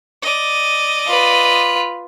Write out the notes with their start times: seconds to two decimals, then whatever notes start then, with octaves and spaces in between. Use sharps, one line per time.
0.22 D5 D#5
1.07 F4 B4